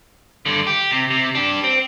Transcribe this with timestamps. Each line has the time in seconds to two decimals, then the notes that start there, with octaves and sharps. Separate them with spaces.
0.46 G2 D3
0.67 G4
0.91 C3
1.10 C3
1.35 D4 G4
1.64 C4